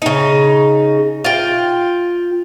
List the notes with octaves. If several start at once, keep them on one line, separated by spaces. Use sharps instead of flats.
C#3 D#4
F4 G5